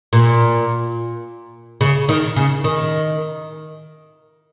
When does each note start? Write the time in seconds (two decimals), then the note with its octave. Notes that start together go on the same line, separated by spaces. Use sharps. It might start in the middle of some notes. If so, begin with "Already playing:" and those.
0.13 A#2
1.81 C#3
2.09 D#3
2.36 C#3
2.64 D#3